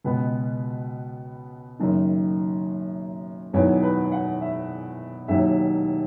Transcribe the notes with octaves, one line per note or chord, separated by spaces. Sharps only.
C#2 B2 G#3 B3 B4
F#1 F#2 D#3
E1 E2 D#3 F#3 B3 C#5
B4
F#5
E5
E1 D#2 D#3 F#3 E5